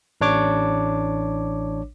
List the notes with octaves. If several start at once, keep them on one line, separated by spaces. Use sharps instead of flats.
A1 D4 C#5 D6